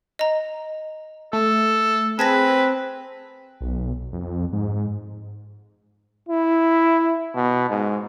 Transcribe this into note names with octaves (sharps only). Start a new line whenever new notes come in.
D#5 A#5
A3 A4
C4 G#4 B4 A5 G#6 A#6
B1
F2
G#2
E4
B2
G#2